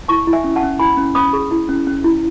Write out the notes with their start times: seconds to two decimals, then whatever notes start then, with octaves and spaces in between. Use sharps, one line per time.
0.08 E4 A5 C#6
0.27 E4
0.33 E5 G#5
0.44 C#4
0.56 F#5 A5
0.63 C#4
0.79 E4 G#5 B5
0.97 C#4
1.15 C#4 B5 D#6
1.33 G#4
1.51 E4
1.69 C#4
1.87 C#4
2.04 E4